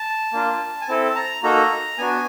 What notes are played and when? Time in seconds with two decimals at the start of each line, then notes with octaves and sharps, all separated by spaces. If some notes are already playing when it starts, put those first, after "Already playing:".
Already playing: A5
0.33 A#3 D4 F4
0.81 G#5
0.88 C4 E4 A4 A5
1.15 A#5
1.43 A#3 D#4 F#4 A4 A#5
1.98 B3 D4 F#4 G#5